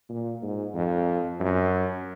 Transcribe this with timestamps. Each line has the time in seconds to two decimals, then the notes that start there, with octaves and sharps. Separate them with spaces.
0.09 A#2
0.42 G#2
0.74 F2
1.40 F#2